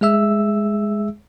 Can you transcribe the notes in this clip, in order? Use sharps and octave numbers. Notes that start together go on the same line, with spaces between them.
G#3 G#4 E5 E6